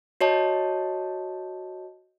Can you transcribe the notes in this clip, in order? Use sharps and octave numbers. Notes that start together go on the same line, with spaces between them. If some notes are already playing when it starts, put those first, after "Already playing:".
F#4 C#5 D#5 A5